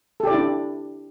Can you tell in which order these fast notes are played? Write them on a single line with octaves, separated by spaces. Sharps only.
A4 G4 D5 E4 D4